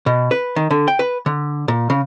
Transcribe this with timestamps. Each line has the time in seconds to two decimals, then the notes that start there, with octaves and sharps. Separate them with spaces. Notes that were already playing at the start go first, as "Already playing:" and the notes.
0.06 B2
0.31 B4
0.56 D#3
0.70 D3
0.88 G5
0.99 B4
1.26 D3
1.68 A#2
1.90 C#3